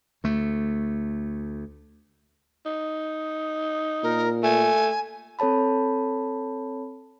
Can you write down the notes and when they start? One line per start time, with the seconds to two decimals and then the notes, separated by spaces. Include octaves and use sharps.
0.24 D2 A3
2.66 D#4
4.03 A#2 A#4
4.43 A3 G#5
5.39 C4 A4 C#5 A5 B5